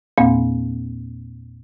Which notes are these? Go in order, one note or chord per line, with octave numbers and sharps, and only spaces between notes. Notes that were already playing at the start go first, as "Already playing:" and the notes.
E2 A#2 A#3 C4 F5